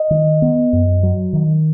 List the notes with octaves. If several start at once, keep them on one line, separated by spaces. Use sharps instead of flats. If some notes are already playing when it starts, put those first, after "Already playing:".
Already playing: D#5
D#3
B3
F#2
F#3
D#3